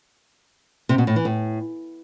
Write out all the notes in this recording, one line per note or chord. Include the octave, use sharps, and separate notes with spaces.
C3
B2
A2
E3
A2